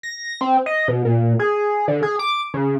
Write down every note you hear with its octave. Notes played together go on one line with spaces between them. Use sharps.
A#6
C4
D#5
B2
A#2
G#4
D3
G#4
D6
C#3